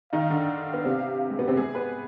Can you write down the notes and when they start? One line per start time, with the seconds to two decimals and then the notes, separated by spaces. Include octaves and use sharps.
0.13 D#3 D#4 F5
0.30 D3 D4
0.74 B3
0.85 C3 C4
1.30 G#3
1.39 B2 B3
1.48 C3 C4
1.57 G#3 G#4
1.75 B3 B4